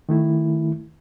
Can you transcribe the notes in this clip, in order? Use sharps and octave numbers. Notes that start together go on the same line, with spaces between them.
D#3 A3 E4